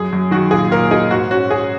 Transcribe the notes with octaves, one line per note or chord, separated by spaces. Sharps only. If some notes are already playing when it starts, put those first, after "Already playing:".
Already playing: F#2 G#4
F#2
D#3 F#4
A#2 G#4
A#2 A#4
D#4 G#4
G#2 F#4
C#4 F#4
C#4 G#4